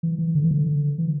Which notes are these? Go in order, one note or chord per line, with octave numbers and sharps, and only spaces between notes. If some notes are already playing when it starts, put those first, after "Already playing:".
E3
E3
D3
E3
D3
D3
E3